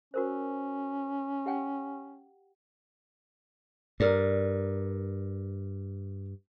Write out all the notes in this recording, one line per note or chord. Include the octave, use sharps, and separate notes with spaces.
C#4 F#4 A#4 C5
G4 F#5 G5
G2 A#4 D5